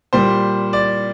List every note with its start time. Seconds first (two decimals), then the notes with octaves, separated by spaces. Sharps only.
0.13 A#2 G3 C5
0.73 D5